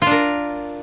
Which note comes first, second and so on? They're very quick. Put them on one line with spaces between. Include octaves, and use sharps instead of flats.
F4 D4 A#4